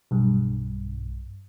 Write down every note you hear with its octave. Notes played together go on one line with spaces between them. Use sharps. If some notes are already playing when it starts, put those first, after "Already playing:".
B1 G2